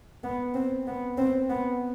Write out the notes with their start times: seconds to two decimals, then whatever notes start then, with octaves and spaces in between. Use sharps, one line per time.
0.24 B3
0.54 C4
0.87 B3
1.18 C4
1.49 B3